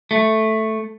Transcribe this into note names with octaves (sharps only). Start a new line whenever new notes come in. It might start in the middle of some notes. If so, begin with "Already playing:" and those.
A3